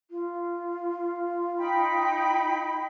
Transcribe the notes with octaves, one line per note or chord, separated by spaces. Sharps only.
F4
D#4 G5 B5